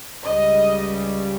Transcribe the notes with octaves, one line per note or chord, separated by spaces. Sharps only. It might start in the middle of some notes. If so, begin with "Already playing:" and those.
C#2 C#3 G3 D#5